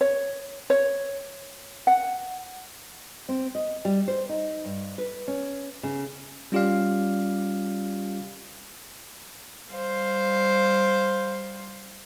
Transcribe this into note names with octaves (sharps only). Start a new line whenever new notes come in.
C#5
C#5
F#5
C4
D#5
G3
C5
D#4
G2
B4
C#4
C#3
G3 C#4 F4 G4 D5 F5
G3 C5 F5